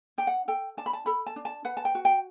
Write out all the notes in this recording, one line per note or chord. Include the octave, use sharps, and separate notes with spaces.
D4 G5
F#5
A4 G5
D4 A5
B5
A5
A4 B5
A5
D4
A5
B4 F#5
A5
G5
F#4
G5